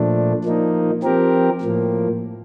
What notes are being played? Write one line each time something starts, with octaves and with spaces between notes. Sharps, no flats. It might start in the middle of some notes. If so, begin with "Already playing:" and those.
Already playing: A#2 F3 A3 D4
F3 A#3 D#4
F3 C4 G4 A#4
A2 F3 A#3